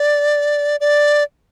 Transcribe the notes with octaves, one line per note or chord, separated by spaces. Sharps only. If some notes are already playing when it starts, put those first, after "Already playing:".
Already playing: D5
D5